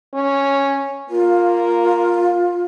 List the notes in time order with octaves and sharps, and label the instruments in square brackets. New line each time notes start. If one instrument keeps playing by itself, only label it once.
[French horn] C#4
[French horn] A#3 [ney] F4